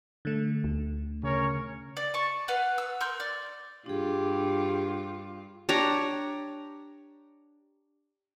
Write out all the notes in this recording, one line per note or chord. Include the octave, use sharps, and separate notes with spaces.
D3 A3
D2
C#3 C#4 A#4 C#5
D5
A5 C#6
B4 F5 F#5
E6
A#4 C6 E6 G6
D5
G2 D4 F4 G4 G#4
D4 G4 C#5 A#5